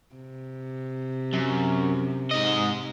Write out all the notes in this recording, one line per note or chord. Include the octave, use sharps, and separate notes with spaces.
C3
F#2
G#2 D#5